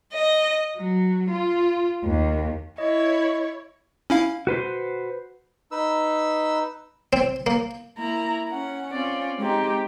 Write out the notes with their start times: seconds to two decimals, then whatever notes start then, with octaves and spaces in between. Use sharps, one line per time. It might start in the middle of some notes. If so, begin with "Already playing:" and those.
0.12 D#5
0.77 F#3
1.31 F4
2.05 D#2
2.78 E4 C#5 D#5
4.10 C#4 E4 F5
4.47 F#4 B4 C5
5.72 D#4 B4 E6
7.13 C4
7.46 A#3
7.97 A#3 E4 A#5
8.49 C#4 F#5
8.92 C4 C#4 F4 D5
9.39 G#3 C4 D#4 G4